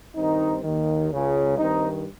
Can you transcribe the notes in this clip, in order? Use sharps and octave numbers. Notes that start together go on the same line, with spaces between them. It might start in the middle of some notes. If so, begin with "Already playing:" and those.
G2 D#3 C4 D#4
D#2 D#3
C#2 C#3
G2 D#3 C4 D#4